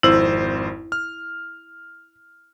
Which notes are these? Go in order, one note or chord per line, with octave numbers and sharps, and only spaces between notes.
G#1 F2 E4 C5
F6